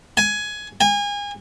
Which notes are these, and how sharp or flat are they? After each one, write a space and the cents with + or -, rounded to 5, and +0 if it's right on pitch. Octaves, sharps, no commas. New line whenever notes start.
G#5 +15
G#5 -30